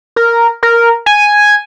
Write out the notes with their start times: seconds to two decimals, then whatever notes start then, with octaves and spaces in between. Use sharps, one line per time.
0.16 A#4
0.63 A#4
1.06 G#5